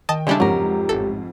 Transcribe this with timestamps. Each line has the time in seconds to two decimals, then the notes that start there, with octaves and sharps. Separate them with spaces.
0.09 D#3 D#5 G5 A5 D#6
0.27 C#3 G3 G#3 D4 E4 A4
0.40 F2 G#2 F#3 G4 A#4
0.89 A1 A4